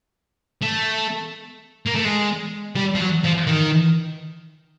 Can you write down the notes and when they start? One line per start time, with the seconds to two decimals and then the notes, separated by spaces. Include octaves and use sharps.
0.62 A3
1.86 A#3
1.95 A3
2.04 G#3
2.76 G3
2.95 F3
3.01 F#3
3.24 F3
3.47 D#3